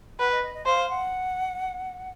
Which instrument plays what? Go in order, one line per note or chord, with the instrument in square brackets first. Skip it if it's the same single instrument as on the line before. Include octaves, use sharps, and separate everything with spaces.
[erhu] B4 [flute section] F#5
[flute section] D#5
D#5
D#5
[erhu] C5 [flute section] F5
[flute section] F#5